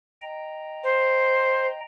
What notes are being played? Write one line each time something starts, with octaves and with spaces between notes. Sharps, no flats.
D#5 G5 A#5
C5